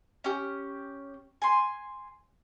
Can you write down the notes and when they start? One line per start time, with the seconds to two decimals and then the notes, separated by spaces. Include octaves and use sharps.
0.24 C#4 G4
1.42 G#5 C6